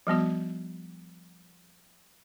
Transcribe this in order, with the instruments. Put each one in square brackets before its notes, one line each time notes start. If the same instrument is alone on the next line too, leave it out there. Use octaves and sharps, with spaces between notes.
[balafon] F3 G3 B3 F#4